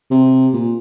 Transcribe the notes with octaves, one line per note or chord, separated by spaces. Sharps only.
C3
A#2